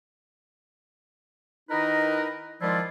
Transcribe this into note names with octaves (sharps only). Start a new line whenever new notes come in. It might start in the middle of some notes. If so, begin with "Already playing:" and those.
D#3 D#4 E4 A#4 B4 D#5
D#3 F3 G#3 E4 F4 D5